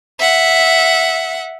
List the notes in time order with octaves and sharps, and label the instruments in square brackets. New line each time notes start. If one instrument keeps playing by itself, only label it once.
[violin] E5 F#5